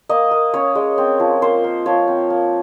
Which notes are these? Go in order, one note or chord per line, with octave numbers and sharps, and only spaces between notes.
A#3 D#5
A#3
C#4 C#5
G#3
C4
F3
A#3 C5
A#3
F3 C#5
C4
A#3